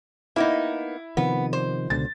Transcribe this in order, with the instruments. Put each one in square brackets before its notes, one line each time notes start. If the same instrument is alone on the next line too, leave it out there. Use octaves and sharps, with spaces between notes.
[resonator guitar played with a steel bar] A#3 B3 D#4 [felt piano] E4
[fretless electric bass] C3 D#3 F3 [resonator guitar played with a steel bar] B3
[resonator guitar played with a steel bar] C5
[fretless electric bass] C#2 B2 D3 [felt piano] A6